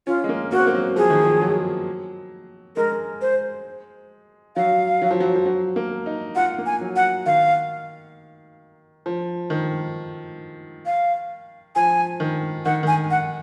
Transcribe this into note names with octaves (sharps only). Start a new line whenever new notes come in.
C#4 F4
G#3
A#3
A#3 F#4
C4
A#3
F#3
F3 G#4
D#3
F3
F#3
G#3 A#4
C5
F#3 F5
F#3
F3
F#3
F3
F#3
A#3
D#4
F4 F#5
A#3
G#5
F#3
F#5
D#3 F5
F3
D#3
F5
F3 G#5
D#3
D#3 F#5
D#3 G#5
F#5